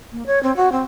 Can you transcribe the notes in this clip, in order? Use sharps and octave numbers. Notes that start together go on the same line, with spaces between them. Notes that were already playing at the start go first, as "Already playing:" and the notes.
A#3
C#5
C4
F#4
C4